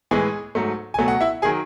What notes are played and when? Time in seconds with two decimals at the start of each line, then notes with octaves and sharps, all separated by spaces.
0.11 A2 E3 G#3 G#4 G#5
0.55 G#2 F#3 A3
0.94 B2 F#3 A3 G#5
1.08 F#5
1.21 E4 E5
1.42 D#3 F#3 G#4 G#5